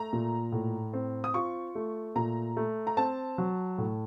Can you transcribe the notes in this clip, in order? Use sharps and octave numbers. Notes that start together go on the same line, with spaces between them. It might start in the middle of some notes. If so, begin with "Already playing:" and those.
Already playing: A3 A#5
A#2
A2
C4
D#6
F4 C#6
A3
A#2 A#5
A3
A#5
C4 A5
F#3
A2